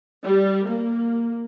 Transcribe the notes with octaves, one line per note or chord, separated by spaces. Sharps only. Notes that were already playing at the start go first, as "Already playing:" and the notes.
G3
A#3